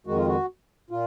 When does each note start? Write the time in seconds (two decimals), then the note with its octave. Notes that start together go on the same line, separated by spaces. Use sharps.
0.07 F2 D#3 G#3 F#4
0.16 F4
0.27 F#4
0.91 A#2 F4